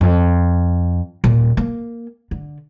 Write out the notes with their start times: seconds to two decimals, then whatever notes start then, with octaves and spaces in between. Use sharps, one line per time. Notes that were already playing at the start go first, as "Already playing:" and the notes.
0.01 F2
1.24 D#1 A#2
1.57 A#3
2.31 D3